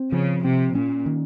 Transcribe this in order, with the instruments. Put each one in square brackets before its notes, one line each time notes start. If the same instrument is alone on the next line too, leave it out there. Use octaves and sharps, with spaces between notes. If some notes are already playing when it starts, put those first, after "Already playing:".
Already playing: [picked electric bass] C4
[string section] C#3 [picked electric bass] F3
[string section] C3 [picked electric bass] C4
[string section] A#2 [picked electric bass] C#4
[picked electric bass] D#3